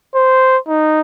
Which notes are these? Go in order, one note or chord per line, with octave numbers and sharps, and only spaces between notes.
C5
D#4